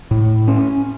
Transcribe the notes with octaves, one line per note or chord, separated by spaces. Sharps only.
A2
C#4